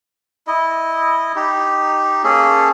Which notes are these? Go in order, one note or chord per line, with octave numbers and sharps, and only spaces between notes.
E4 D#5
D#4 G4
A#3 C#4 G#4 A4